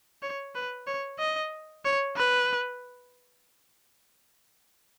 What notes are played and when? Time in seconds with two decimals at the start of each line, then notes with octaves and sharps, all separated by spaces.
0.22 C#5
0.55 B4
0.87 C#5
1.19 D#5
1.85 C#5
2.16 B4